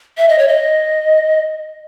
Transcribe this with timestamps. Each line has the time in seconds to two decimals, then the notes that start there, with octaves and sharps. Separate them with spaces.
0.18 E5
0.29 D#5
0.38 C#5
0.48 D#5